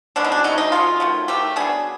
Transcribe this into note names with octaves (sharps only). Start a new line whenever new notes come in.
B2 G#3 C#4 D4
D#4
D4
C#3 F#3 A3 D#4
D#4
C#3 F#3 A3 F4
D#3 F#3 A3
D#3 F#3 A3 G4
F#3 B3 D4 G#4